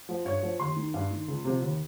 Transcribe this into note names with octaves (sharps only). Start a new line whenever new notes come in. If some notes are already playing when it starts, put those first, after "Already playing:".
F3
G2 C#5
F3
D#2 C6
D#3
G2
D#3
C#2
C3 F3
D#2